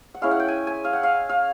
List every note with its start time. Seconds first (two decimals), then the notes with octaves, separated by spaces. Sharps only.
0.14 F#5
0.22 G#3 C#4 E4 F5
0.31 F#5
0.40 G5
0.48 G#5
0.67 G#5
0.85 F5
0.93 F#5
1.03 F5
1.29 F5